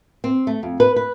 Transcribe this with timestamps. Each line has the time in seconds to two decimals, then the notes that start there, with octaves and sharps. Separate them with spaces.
0.24 C4
0.47 A3
0.63 F2
0.80 B4
0.96 B4